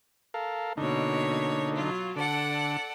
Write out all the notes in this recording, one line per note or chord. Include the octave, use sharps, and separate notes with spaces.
A4 A#4 F5
B2 D3 A#3 D#4 C#5
F#3 F4
D3 A4 D5 F#5